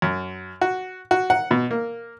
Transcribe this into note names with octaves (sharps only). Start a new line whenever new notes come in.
F#2
F#4
F#4
F#5
B2
A#3